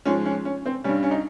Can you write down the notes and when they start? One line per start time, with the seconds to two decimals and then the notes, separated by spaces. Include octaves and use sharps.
0.05 G#2 F3 G#3 C#4
0.26 C#4
0.45 C#4
0.66 C4
0.84 G2 G3 C#4
1.03 C#4
1.11 D#4